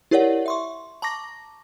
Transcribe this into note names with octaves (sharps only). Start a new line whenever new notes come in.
E4 G4 A#4 C#5 D5 F#5
E5 C6 C#6
A5 A#5 C#6 D6 A#6